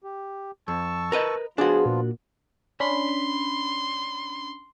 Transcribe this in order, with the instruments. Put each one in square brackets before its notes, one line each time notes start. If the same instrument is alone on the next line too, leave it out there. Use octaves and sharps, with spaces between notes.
[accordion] G4
[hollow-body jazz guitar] F2 [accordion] A5 C#6 E6
[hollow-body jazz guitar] A#4 B4 D#5
[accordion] F3 B3 F4 [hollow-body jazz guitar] D4 F#4 [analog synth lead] G#4
[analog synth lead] A#2
[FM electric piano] C#4 D4 B5 [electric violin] C6